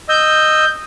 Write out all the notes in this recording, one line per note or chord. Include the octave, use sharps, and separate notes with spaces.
D#5 E6 G6